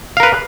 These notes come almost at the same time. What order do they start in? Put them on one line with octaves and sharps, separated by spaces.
F5 A#4 B4